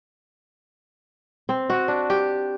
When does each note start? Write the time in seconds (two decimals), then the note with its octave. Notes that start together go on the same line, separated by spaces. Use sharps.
1.49 C4
1.70 F#4
1.88 D4
2.10 G4